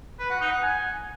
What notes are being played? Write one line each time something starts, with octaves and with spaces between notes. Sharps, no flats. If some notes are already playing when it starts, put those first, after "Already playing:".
B4
F#5
D#4
F#5
G#5